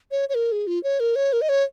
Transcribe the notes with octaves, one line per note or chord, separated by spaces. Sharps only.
C#5
C#5
A#4
G#4
F4
C#5
A#4
C#5
A#4
D#5
C#5